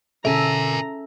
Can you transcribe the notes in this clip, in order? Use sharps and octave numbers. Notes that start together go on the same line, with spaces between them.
B2 D3 C#4 A4 A#4 E5 G#5 A#5